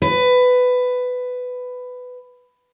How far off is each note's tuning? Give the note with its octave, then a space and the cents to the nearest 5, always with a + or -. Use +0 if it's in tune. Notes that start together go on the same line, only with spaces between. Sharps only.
B4 +15